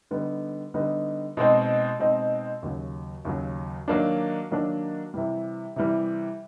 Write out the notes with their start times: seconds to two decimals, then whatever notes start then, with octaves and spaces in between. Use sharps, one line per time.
0.11 D3 G3 B3 D#4
0.74 D3 G3 B3 D#4
1.37 B2 G#3 C4 D#4
1.99 B2 G#3 C4 D#4
2.62 D#2 C#3 F#3
3.25 D#2 C#3 F#3
3.88 D#3 F#3 A#3 D4
4.51 D#3 F#3 A#3 D4
5.14 C3 E3 G3
5.76 C3 E3 G3